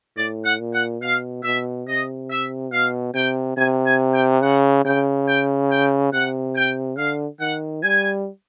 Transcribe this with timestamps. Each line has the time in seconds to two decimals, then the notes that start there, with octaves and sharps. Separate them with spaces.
0.16 A2 D5
0.44 F#5
0.59 A#2
0.73 F#5
1.01 B2 F5
1.44 B2 E5
1.87 C3 D#5
2.30 E5
2.72 B2 F5
3.14 C3 G5
3.57 C3 G#5
3.86 G#5
4.13 G5
4.42 C#3 F#5
4.85 C#3 G5
5.27 G5
5.70 G5
6.13 C3 F#5
6.55 G5
6.97 D3 F5
7.40 D#3 F#5
7.83 G3 G#5